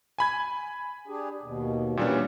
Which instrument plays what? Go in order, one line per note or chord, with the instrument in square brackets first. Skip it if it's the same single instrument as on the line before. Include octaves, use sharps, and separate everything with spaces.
[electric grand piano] G#5 B5 G#6
[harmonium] D4 G4 G#4
D#2 B2
[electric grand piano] A#2 G3 D4 [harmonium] E3 B3 C#4